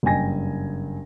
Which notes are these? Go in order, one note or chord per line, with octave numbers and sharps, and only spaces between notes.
F#1 G2 G5 G#5 A#6